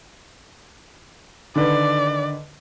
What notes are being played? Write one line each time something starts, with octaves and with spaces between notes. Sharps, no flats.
D3 D#3 B4 D5